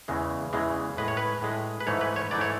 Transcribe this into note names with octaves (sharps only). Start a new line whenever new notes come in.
E2 C#3 E3 G#3
E2 C#3 E3 G#3
A2 G#3 B4
C#5
B4
A2 G#3
B4
G#2 E3 A3 C#5
B4
C#5
G#2 E3 A3 D5
C#5